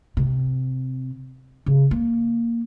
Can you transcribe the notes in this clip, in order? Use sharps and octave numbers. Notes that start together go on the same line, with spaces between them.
C3
C#3
A#3